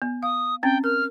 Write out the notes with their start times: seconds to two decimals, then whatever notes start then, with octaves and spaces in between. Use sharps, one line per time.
0.02 B3
0.23 F5 D#6
0.63 C4 C#4 G5
0.84 A#4 F6